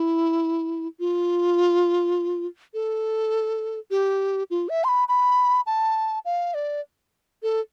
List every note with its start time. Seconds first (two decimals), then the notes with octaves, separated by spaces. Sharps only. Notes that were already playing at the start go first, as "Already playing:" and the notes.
Already playing: E4
0.99 F4
2.74 A4
3.91 G4
4.50 F4
4.69 E5
4.84 C6
4.88 B5
5.08 B5
5.66 A5
6.25 F5
6.54 D5
7.43 A4